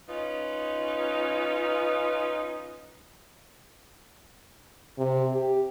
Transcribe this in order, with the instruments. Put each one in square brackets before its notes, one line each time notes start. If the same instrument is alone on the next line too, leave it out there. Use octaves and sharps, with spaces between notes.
[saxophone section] C#4 D#4 F4 B4
[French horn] C3
G4